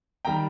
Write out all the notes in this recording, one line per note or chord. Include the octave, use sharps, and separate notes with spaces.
D#3 G3 G5 A#5